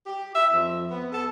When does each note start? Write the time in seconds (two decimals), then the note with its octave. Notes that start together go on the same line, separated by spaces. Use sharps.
0.06 G4
0.35 E5
0.52 F2
0.90 B3
1.13 A4